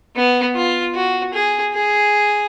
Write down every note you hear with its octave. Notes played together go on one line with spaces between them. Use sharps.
B3
F4
F#4
G#4
G#4